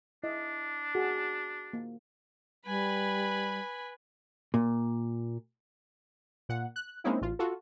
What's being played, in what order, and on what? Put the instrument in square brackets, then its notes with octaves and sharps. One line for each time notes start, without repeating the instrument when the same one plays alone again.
[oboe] D4 [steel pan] E4 D#5
[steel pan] F#4 G#4
A#3
[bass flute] G3 [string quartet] B4 G#5 B5
[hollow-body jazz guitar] A#2
[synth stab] A#2 F#5
F#6
G#3 A#3 C4 C#4 D#4 E4
A1 F4
F4 F#4 A4